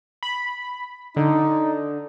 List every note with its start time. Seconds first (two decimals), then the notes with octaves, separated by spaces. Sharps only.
0.23 B5
1.17 D3 D#4